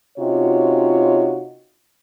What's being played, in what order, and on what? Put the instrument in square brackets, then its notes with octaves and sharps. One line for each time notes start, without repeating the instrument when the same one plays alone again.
[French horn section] C3 C#4 D#4 F4 F#4 C#5